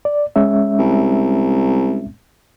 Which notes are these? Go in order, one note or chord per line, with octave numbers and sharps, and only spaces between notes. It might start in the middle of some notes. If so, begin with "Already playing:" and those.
D5
G#3 C#4 E5
C2